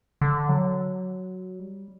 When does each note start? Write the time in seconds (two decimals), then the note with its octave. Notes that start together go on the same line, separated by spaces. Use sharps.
0.21 D3
0.49 F#3
1.59 G3